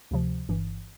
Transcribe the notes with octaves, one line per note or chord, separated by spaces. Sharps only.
D2 C3 F3
G1 G2 E3